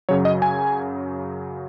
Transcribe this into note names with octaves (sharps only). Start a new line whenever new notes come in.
F#2 C#3 F#3 C#5
D#5
G#5